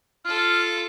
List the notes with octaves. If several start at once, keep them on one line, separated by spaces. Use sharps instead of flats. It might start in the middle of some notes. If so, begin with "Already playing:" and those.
F4 A4 F6